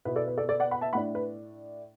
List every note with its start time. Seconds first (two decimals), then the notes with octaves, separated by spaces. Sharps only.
0.05 B2 B3 E4 B4
0.16 A4 D5
0.27 B4
0.37 A4 D5
0.49 A4 D5
0.60 D5 F#5
0.71 F#5 B5
0.81 E5 A5
0.93 A2 A3 D4 F#5 B5
1.15 B4